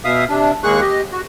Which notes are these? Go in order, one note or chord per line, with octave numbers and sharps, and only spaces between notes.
B2 E5 F5 D#6
C3 D4
D#2 G#3 A#3 G#4 C#6 F#6
G4 D#5
F#4